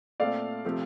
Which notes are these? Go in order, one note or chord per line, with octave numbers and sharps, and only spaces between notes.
A#2 A3 C4 D5 F5
C3 F3 A3 C4